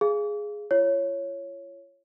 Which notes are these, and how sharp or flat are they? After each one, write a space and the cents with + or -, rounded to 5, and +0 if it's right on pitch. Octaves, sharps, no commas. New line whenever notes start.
G#4 +0 F5 -20
F4 -40 C#5 +0